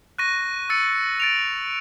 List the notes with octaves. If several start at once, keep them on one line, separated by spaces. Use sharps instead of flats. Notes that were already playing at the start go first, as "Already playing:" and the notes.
C#6 F#6 A#6 D#7
E6 A6 C#7
A6 D7 F7